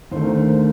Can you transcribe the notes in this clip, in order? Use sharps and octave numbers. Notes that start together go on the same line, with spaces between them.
D#2 D3 A3 C5
A#4
C5